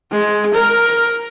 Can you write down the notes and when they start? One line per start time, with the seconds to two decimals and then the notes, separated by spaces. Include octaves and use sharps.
0.12 G#3
0.54 A#4